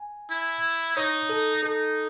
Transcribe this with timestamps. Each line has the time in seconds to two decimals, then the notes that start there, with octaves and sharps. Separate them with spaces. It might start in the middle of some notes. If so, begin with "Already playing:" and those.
Already playing: G#5
0.30 E4
0.96 D#4 C#5
1.29 A4
1.63 D#4 A4